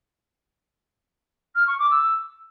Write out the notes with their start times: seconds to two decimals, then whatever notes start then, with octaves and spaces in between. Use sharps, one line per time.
1.55 F6
1.67 C#6
1.78 D6
1.90 E6